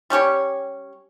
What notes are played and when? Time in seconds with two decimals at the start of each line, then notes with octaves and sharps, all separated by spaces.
0.10 G3 C#4 G4 C#5